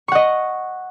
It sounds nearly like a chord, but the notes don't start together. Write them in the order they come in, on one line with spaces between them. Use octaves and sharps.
C#6 F#5 D#5